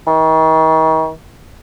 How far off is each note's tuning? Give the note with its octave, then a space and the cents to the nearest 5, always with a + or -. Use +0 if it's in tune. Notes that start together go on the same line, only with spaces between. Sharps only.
D#3 +40